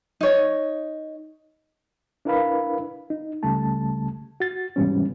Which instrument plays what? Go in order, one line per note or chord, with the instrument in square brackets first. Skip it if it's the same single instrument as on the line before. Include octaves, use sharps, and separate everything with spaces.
[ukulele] D#4 C#5
[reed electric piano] D4 E4 A#4 B4 F5 B5
D#4
C#2 C#3 G3 A3 A5
F#4 A6
G#2 C3 E3 G3 B3 C#4